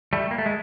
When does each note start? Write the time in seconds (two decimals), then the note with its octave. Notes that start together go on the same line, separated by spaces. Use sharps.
0.13 G3 A3
0.31 A#3
0.38 A3
0.46 G#3